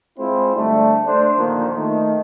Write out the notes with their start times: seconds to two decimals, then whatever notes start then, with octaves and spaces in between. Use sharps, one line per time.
0.19 G#3 C4 E4 F4
0.56 D3 G3 A3
1.07 A3 D4 C5
1.38 A#2 D3 D#3 F3 A#3
1.76 D#3 A3